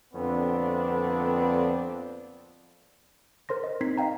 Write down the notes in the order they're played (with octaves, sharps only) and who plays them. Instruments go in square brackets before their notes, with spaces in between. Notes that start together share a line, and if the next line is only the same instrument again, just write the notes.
[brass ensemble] F2 A#2 D3 B3 C4 D4
[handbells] A#4 C5 C6 A#6
D#5
C4 D#4 G#6 B6 C7
D#5 F5 G5 A#5